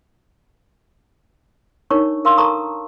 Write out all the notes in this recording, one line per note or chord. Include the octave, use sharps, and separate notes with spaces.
D4 D#4 A#4 C#5 C#6
A#4 F5 C6 E6
A4 A#4 A5 A#5 C#6 D#6